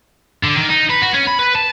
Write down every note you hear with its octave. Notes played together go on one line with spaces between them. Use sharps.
D3
D#3
D#4
B4
F#4
C#4
B5
B4
A5